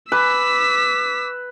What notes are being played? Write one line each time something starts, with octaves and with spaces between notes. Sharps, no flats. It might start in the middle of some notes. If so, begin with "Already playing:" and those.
B4 D6 E6 B6